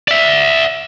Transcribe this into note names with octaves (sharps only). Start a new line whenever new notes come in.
D5 E5